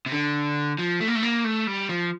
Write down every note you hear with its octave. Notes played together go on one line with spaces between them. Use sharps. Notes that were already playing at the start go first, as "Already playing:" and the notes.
C3
D3
F3
A3
A#3
A3
A#3
A3
G3
F3